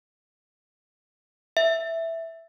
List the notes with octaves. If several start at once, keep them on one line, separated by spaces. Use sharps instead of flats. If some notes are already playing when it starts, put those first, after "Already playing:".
E5